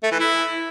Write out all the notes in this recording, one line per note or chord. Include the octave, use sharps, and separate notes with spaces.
A3
E3
E4